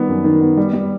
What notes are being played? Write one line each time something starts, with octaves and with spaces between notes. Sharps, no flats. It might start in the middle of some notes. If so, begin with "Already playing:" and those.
Already playing: D#3 G3 B3
F#2
D#3
B3
G3
G3